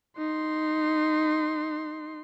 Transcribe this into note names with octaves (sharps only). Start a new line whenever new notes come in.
D#4 C6